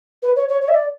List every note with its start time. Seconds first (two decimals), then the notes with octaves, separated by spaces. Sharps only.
0.23 B4
0.36 C#5
0.49 C#5
0.62 C#5
0.68 E5
0.74 D5